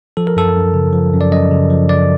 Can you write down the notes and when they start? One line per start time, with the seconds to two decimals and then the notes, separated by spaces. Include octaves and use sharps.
0.17 F3 A4
0.27 A#4
0.37 F#2 A4
0.56 F#2
0.74 C#3
0.93 F3
1.13 F#2
1.21 D5
1.32 F#2 D#5
1.51 C#3
1.70 F3
1.89 F#2 D5